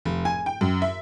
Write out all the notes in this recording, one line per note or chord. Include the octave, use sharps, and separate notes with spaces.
F1
G#5
G5
F#2
E5